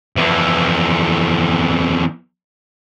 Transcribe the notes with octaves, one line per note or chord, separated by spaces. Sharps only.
F2 E3